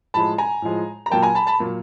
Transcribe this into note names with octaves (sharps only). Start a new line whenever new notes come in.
A2 F3 G#3 A5 B5
G#5 A#5
A2 F3 G#3
A#5
A#2 F#3 A#3 G5 A5
G#5 A#5
A5 B5
A5 B5
A#2 F#3 A#3